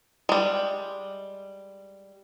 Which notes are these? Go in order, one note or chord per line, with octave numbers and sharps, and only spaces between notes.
G3 G#3